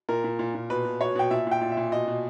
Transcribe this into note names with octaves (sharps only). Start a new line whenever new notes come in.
A#2 A#4
A#2
A#2
A#2
B2 B4
B2
B2 C#5
B2 G5
A#2 E5
A#2 G5
A#2
E5
A#2
B2 D#5
B2